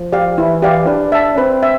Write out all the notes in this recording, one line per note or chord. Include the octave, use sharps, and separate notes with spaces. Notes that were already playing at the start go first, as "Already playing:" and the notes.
Already playing: F3
G4 D5 F5
E3 E4
G4 D5 F5
D4 B4
E5 A5
C4 B4
E5